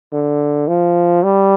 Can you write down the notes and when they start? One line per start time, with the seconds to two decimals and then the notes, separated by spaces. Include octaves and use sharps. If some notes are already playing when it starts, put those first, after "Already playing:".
0.13 D3
0.68 F3
1.23 G3